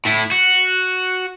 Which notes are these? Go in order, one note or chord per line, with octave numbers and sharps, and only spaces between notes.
A2 E4
F#4